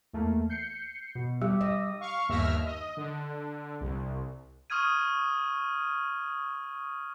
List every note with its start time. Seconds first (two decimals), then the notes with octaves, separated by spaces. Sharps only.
0.13 E2 A3 A#3
0.50 G6 C7 C#7
1.15 B2
1.42 G3 G4
1.61 D#5 E6
2.01 F5 C#6
2.29 G1 D#2 E5 F6 A#6
2.65 D#5
2.97 D3
3.81 C2
4.70 C#6 D#6 F6 G#6 D#7